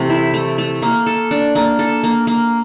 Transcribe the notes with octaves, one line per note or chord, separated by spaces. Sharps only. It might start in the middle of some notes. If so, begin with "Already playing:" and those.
Already playing: C3 E3 A3
E4
A3
A3
A#3
A4
D4
A#3
A4
A#3
A#3